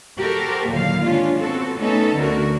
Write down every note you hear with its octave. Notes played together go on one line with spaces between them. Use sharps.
F#4 G4 A4 A#4 C5
D#2 A#2 D3 F#3 F5
G#3 C#4 D4 F4
B3 C4 F#4 A4
A3 B3 C#4 D#4 A4
D2 D3 A3 F#4 A#4